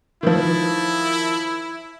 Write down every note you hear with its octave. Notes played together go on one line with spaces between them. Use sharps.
D#3 F3 E4